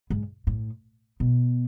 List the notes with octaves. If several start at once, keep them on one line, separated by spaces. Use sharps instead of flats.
G#2
A2
B2